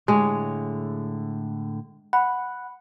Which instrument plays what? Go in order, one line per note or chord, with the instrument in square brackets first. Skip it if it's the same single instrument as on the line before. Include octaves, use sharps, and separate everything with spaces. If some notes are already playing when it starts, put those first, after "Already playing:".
[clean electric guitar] A2 D3 C#5 [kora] G#3
[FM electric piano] F#5 [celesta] B5